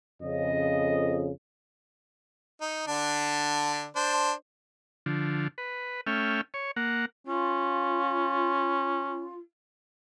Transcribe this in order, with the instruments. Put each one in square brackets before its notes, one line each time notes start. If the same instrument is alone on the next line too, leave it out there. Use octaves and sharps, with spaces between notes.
[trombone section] F2 C#3 [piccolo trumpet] D#5
[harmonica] D#4
D3 D4
D4 C5
[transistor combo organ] D3 F3
B4
A3 C#4 E5 G5 F6
C#5
A#3 F#5
[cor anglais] C#4 [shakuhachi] F4